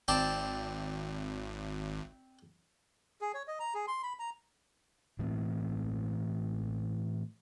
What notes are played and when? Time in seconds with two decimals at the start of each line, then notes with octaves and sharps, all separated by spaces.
0.08 G#1 C4 D5 A5
3.21 G#4
3.34 C#5
3.48 D#5
3.60 A#5
3.74 G#4
3.88 C6
4.03 B5
4.19 A#5
5.19 A2 E3 A3 C4